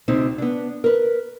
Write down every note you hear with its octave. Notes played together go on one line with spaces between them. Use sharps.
D2 C3 C4 D#4
B3 D4
A#4 B4